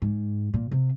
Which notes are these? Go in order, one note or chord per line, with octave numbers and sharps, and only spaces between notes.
G#2
A#2
C3